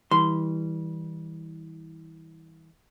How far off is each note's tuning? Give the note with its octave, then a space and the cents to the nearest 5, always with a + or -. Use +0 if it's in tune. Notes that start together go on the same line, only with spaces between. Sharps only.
E3 -30 G3 +0 C6 -10